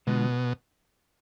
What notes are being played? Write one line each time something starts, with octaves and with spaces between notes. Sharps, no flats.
B2 D3 G#3 D4 F4